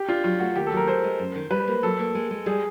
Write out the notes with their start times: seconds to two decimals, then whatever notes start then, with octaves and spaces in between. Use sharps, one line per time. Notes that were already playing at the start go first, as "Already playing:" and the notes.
Already playing: G4
0.08 D4 F4
0.24 F#3 F4
0.39 A3 F#4
0.55 D#2 G4
0.67 A4
0.72 F#3
0.77 A#4
0.88 G#3 C5
1.04 G#3
1.19 F#2
1.35 D#3
1.51 G3 B4
1.68 A#3
1.83 F#3 A4
1.99 A#3
2.15 G#3
2.31 G#3
2.46 G3 G#4